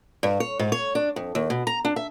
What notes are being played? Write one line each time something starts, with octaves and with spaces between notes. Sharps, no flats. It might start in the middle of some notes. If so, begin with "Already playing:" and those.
G2
C#5
G#2
C#5
D4
F2
D#2
B2
A#5
D4
E5